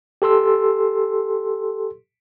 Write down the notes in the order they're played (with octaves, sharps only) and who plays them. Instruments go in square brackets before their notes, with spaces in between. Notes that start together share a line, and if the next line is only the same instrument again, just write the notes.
[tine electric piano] G4 A4 C6 E6